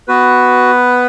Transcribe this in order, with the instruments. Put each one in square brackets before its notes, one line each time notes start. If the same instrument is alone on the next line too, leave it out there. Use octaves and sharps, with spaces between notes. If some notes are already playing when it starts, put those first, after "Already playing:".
[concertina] B3 F#4 B4